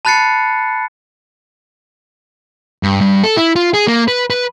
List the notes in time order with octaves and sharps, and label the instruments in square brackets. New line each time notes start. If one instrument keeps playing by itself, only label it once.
[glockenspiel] A5 B5 F#6 A6 C7 C#7
[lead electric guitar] G2
G2
A4
E4
F4
G#4
A#3
B4
B4